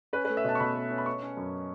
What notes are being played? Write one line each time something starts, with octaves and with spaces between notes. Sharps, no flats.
C#4 B4
A3 B4
E5
B2 A5
C#6
B2 B5
A3
C#4
B5
C#4 C#6
C#4
F#2